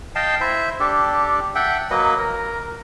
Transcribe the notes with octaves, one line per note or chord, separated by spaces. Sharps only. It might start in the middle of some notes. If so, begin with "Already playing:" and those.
D#5 F5 G5 A5
E4 C5 E5
D4 G4 A4
A4 E5 F#5 G5
F#3 A#3 B4 D#5
A#4